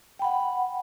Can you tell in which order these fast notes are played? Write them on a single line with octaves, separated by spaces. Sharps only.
G5 B5 F#5